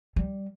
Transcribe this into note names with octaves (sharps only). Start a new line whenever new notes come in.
G3